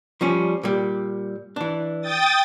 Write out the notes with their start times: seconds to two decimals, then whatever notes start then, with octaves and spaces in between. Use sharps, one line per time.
0.21 F3 G3 C#4
0.63 A#2 G3
1.56 E3 D4
2.01 G5 D#6 A6